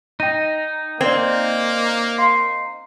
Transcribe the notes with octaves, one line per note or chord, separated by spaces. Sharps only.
D#4 G5 A#6 D#7
A#3 C4 D5 G#6
F5 C6 C7